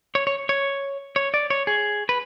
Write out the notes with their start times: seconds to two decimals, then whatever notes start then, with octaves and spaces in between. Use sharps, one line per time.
0.15 C#5
0.27 C#5
0.49 C#5
1.16 C#5
1.34 D5
1.50 C#5
1.67 G#4
2.09 B4